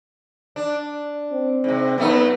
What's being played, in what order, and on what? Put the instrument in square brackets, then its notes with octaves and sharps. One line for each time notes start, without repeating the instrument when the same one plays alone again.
[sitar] D4
[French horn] C4
[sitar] G#2 C3
[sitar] F#2 A3 D#4 [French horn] B3